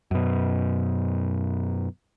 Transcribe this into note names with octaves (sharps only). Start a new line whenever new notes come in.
F#2 B2